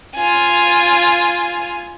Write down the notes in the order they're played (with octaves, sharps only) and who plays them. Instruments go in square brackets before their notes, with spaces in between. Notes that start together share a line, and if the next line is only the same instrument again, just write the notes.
[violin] F4 G#5